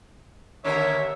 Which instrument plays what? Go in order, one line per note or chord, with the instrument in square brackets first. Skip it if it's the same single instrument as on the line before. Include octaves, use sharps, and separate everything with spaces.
[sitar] D#2 D3 A#4 [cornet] C#5 [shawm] E5